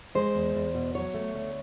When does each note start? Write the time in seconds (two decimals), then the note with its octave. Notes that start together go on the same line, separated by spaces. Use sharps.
0.15 G#3 C5
0.35 E2
0.55 E2
0.74 B2
0.95 F#3 C#5
1.14 A3
1.34 D2